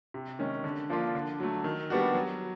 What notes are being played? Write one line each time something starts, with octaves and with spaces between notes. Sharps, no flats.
C3
D#3 G#3 C#4
D3
F3 A#3 D4 F4
D3
F#3 A3
D#3
G3 B3 D4 F#4
F#3